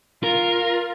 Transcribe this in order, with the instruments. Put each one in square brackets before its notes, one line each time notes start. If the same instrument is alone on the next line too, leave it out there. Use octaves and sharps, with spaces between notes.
[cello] F4 [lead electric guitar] A#4